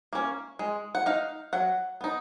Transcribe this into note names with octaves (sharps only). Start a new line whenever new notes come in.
A#3 C#4
G#3
F#5
D#4 F5
F#3 F#5
B3 D#4